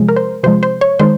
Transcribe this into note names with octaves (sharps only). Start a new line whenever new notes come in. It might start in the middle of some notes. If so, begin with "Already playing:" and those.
Already playing: C3 F3 G#3
A#4
C5
C3 F3 G#3 C5
C5
C#5
D#3 G#3 C5